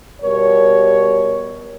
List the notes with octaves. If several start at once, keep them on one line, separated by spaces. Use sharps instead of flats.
B2 G3 A#4 C#5